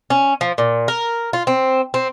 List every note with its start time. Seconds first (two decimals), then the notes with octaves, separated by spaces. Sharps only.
0.10 C#4
0.41 F3
0.58 A#2
0.88 A#4
1.33 F4
1.47 C4
1.94 C4